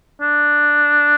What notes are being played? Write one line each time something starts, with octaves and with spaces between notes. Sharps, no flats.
D4